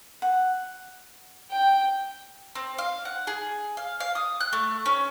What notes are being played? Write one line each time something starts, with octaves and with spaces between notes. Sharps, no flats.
F#5
G5
C4
F5
F#5
G#4
F5
F5
D#6
F#6
A3
C#4